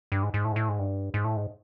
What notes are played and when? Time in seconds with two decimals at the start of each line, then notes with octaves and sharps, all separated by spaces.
0.12 G2
0.23 G#2
0.34 G#2
0.45 A2
0.52 G#2
0.56 A2
0.69 G#2
0.79 G2
1.14 G#2
1.24 A2
1.36 G#2